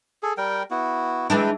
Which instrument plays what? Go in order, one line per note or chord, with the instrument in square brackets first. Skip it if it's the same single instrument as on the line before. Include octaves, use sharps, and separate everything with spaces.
[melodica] G#4 A4
G3 A#4 G5
B3 E4 F#4
[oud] E3 G#3 D4 [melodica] B4 G5